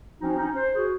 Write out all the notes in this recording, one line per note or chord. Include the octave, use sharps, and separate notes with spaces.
F3 C4 C#4 D#4 F#4
C#4 D#4
C5
F#4 G#4